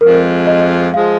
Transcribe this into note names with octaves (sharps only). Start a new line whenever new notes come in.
F2 F3 G#3 A#4
D#5
F3 G#3 F5